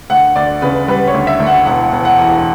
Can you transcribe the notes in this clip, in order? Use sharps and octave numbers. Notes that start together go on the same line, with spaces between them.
D2 F#5
D2 D5
C#3 B4
G3 B4
C#5
D2
E5
D2
F#5
E1 F#5
E1
F#5
E2